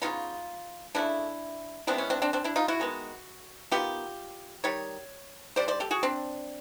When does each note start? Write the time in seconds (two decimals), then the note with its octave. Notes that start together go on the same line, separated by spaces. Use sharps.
0.02 C#3 F#3 B3 D#4 F4
0.95 C#3 F#3 A3 D4 E4
1.87 E3 G#3 B3 C4 D4
1.98 C#4
2.10 C4 D4
2.22 C4 D4
2.33 C4 D4
2.44 D4 E4
2.56 D#4 F4
2.68 E4 F#4
2.80 D#3 G#3 B3
3.71 D#3 G3 B3 F4 G4
4.64 D#3 G3 C#5
5.56 D3 G3 C5 D5
5.68 C5 D5
5.80 G4 A4
5.91 F#4 G#4
6.03 C4 D4